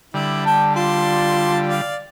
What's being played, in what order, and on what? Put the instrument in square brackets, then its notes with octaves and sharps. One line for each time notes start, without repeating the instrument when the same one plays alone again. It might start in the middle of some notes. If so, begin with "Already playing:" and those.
[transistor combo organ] D3 G3 [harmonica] E4
[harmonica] G5 [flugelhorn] A5
[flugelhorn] F4 [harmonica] A5 C6
[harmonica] D5 F5